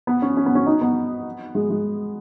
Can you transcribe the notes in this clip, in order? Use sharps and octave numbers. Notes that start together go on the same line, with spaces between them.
B3
C#4
C#4
B3
C#4
D#4
B3
G#3
G#3